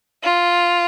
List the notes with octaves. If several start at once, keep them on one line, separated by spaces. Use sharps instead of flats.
F4